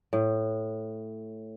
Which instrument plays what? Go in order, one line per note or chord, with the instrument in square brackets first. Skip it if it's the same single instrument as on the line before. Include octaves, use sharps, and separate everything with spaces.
[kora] A2